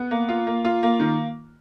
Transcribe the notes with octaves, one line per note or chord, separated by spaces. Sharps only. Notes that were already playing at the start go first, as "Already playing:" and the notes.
Already playing: B3
A#3
F4
A#3
F4
A#3
D#3